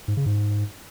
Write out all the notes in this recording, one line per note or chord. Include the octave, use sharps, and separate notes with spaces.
G#2
C#3
G#2